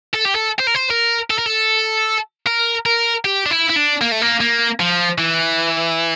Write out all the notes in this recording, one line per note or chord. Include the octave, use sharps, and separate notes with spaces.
A4
G4
A4
C5
A#4
C5
A#4
A4
A#4
A4
A#4
A#4
G4
D4
E4
E4
D4
A#3
A3
A#3
A#3
F3
E3